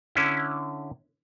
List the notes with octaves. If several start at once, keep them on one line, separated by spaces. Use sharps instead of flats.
D3 C#4 E4